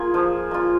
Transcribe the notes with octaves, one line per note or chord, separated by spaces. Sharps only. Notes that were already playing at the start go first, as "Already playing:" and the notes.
Already playing: A#3 F4 G#4
F3
A#3 F4